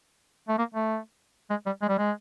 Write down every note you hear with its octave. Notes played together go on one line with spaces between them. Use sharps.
A3
A#3
A3
G#3
G3
G#3
G3
G#3